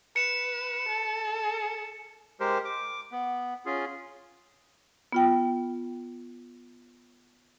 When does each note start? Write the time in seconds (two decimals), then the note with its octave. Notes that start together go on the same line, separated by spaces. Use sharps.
0.16 B4 C#7 E7
0.89 A4
2.40 G#3 G4 A#4 C5
2.65 D6
3.12 B3
3.66 C#4 F4 G#4
5.12 B3 F4 G5